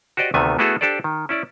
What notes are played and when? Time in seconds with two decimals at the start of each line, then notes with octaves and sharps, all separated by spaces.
0.17 F#4 G4 C5 D5 D#5
0.34 D2 C3 D#3 A3 B3 G#5
0.59 A3 B3 E4 F#4 G#4 A4
0.81 D4 G4 A4 C5 D5
1.04 D#3
1.29 C#4 E4 D5